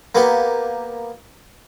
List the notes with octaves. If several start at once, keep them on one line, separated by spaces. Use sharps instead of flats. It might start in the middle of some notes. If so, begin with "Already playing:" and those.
A#3 B3 G4